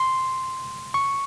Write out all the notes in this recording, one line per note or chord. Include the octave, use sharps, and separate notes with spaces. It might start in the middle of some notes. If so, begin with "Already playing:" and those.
Already playing: C6
C#6